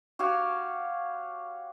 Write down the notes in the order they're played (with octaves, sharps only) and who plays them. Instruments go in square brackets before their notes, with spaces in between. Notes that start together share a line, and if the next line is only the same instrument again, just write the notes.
[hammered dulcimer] F#4 G4 C#5 F5